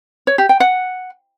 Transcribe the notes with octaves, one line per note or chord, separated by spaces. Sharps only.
C#5
G4
G5
F#5